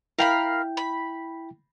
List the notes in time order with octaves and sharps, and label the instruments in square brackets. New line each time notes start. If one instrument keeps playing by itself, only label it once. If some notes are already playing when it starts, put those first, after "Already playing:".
[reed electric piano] E4 G5 [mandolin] A#4 F5 B5
[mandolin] B5